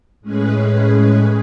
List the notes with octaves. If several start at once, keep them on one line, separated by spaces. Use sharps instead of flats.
A2 G#3 C#4 G#4 B4